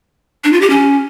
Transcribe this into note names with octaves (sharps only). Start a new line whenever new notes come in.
D4
F4
G4
C#4